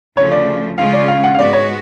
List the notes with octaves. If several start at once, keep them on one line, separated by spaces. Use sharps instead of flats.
D2 C#3 F3 A3 C#5
D5
C#3 G#3 C#4 F4 F5
D5
F5
F#5
F5
G#2 G#3 B3 F#4 D5
C#5